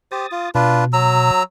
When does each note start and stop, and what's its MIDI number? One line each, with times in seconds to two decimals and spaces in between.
0.12 0.26 67
0.12 0.26 72
0.12 0.51 87
0.12 0.51 93
0.32 0.49 65
0.55 1.31 47
0.55 0.84 62
0.55 0.84 65
0.55 0.84 71
0.93 1.43 54
0.93 1.43 82
0.93 1.43 88